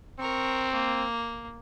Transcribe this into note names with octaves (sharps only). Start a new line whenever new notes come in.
C4 A#4 C#6
A#3